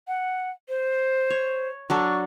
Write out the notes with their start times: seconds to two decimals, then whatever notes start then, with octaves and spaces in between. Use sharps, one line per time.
0.08 F#5
0.69 C5
1.30 C#5
1.90 F#3 D4 A4 C#6